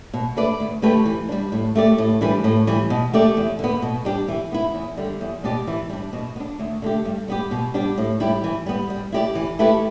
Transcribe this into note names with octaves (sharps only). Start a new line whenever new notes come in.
B2
A3 D4 B4 D5
D2
D3 A3 G4 B4
E3
G3 D4
A2
A3 G4 D5
A2
E3 G3 D4 B4
A2
E3 G3
B2
A3 G4 D5
E2
D3 B3
B2
G3 D4 G4
E3
B3 E4
E2
D3 G3
E2
B2 B3 G4 D5
E3
G3 D4
B2
B3
D4
D2
D3 A3 G4
G2
G3 B3 G4
B2
G3 B3 D4 G4
A2
G3 E4 G4
E3
G3 B3
G3
E4 G4 B4 D5
E3
A3 E4 G4 B4